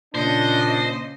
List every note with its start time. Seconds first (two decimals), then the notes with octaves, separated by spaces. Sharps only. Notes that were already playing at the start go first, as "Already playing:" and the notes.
0.15 A#2 C#3 D4 C5 D#5